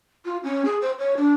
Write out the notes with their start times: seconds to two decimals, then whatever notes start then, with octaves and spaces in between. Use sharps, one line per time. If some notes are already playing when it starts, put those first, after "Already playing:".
0.25 F4
0.43 C#4
0.65 G#4
0.82 C5
0.99 C#5
1.17 D4